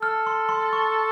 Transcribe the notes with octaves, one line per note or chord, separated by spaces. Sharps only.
A4 F6
C6
C6
C#6